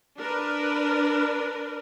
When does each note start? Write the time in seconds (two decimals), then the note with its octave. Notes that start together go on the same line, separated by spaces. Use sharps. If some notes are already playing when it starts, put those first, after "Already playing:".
0.18 D4 A#4 B4